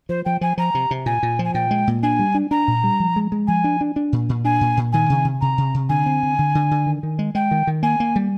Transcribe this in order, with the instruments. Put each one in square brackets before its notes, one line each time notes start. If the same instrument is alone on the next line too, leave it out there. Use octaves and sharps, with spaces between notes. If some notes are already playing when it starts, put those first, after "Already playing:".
[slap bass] F3 [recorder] C5
[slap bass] F3 [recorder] G5
[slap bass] F3 [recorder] G#5
[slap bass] F3 [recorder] A#5
[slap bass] C3
C3
[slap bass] A#2 [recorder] G#5
[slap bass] A#2
F3
[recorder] G#5
[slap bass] A#2 [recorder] G5
[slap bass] G#3
A#2
[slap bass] D4 [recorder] G#5
[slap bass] G3
D4
[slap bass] D4 [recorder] A#5
[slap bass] A#2
G3
F3
G#3
G#3
[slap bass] F3 [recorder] G#5
[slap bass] D4
D4
D4
A#2
A#2
[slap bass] D4 [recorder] G#5
[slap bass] A#2
A#2
[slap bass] D#3 [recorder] G#5
[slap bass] C3
C3
[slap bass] C3 [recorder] A#5
[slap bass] C3
C3
[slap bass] D3 [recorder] G#5
[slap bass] C4
D3
D3
D3
D3
D#3
D#3
G#3
[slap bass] G#3 [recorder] G5
[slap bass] D#3
D#3
[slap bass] A#3 [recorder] G#5
[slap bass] A#3
G3